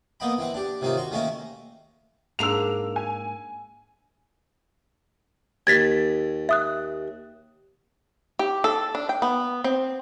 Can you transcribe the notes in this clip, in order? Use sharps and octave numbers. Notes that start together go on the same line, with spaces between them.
A#3 B3 D#5 G5 B5
E3 C4 F#5
D4 G4
C3 D#3 A#3 C#4 D#4 F4
F#4 C6 C#6
D#3 A3 A#3 C#4 A#4 E5
G#2 A#3 D4 E6 F7
G#5
D#2 G#6 A6 B6
E5 D#6 F#6
G4
A4
D4
G5
B3
C4